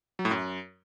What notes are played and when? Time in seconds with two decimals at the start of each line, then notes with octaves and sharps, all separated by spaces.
0.19 F#3
0.25 A2
0.31 F#2